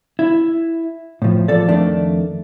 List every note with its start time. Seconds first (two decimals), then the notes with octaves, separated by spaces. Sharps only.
0.19 E4
1.22 A2 F3
1.48 F3 A4 D5
1.68 F2 D#3 A3 D4